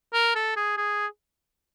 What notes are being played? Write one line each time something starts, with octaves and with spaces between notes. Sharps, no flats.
A#4
A4
G#4
G#4